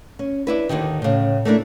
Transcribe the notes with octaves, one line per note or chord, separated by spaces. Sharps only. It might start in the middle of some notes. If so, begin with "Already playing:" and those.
C#4
D4 E4 B4
D#2 A2 D3 D#3
A2 C#3
A3 A#3 D4 E4